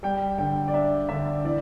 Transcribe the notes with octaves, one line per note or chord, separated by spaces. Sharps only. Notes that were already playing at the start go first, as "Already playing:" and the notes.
G3 G5
D3 G5
D5
D4 E5
D3 E5
E3 D5